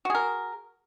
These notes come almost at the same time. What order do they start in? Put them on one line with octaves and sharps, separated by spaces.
F#4 G#4 A#4